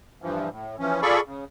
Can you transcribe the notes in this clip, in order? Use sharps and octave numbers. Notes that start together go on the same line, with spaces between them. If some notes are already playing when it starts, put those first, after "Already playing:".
G2 E3 F3
A2
E3 F3 C#4
F4 G#4 A4 D5 B5 C#6
C#3